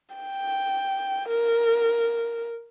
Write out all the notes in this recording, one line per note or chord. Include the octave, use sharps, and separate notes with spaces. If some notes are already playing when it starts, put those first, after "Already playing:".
G5
A#4